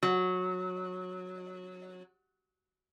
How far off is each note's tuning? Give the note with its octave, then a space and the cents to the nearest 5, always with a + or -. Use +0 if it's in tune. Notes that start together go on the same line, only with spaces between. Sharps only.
F#3 -15